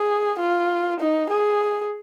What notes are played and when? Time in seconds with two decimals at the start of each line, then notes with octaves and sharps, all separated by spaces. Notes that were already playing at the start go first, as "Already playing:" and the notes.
Already playing: G#4
0.39 F4
1.00 D#4
1.30 G#4